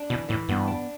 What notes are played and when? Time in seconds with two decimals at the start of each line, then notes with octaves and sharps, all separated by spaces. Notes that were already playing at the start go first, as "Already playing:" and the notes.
Already playing: D4
0.10 B2 E3
0.29 A2 E3
0.49 G2 B3
0.68 D4